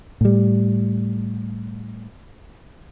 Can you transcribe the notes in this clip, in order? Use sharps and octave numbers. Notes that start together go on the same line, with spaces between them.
A2 G3